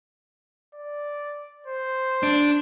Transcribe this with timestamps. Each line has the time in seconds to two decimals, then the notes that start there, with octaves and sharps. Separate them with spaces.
0.74 D5
1.66 C5
2.23 D4